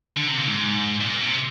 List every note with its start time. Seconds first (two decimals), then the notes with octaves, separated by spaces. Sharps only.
0.16 D3
0.27 C3
0.37 A#2
0.48 G#2
1.01 A#2
1.21 C3